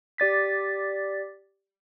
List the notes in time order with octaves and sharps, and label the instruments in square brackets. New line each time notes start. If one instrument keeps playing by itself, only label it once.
[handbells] G4 D5 A6 B6